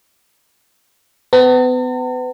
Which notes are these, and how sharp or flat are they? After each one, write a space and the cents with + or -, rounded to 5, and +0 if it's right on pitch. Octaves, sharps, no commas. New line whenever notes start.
B3 +35 A5 +45